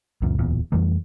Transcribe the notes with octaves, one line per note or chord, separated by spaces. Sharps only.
C#2 F#2 A#2
D1 E2 A#2
F2 E3 G3 A3